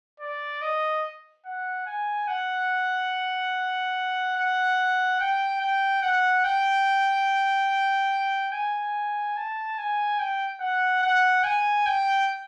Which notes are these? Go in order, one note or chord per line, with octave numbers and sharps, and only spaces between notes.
D5
D#5
F#5
G#5
F#5
F#5
G5
G5
F#5
G5
G#5
A5
G#5
G5
F#5
F#5
G#5
G5